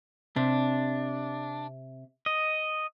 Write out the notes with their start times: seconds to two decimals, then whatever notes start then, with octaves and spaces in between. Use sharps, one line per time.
0.36 C3 D4
2.26 D#5